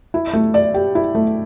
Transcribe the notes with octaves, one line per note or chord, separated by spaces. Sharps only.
E4
A3
D5
G4
E4
A3